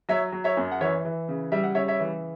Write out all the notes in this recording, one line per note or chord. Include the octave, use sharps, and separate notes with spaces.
F#3 C#5 E5
F#3
C#5 E5
F#2
F#5
E3 C#5 E5
E3
C#3
G3 E5
F#5
C#3 C#5 E5
C#5 E5
E3